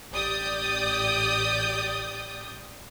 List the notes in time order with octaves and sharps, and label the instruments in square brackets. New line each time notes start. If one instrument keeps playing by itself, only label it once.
[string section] A1 G4 D5 D#6 G6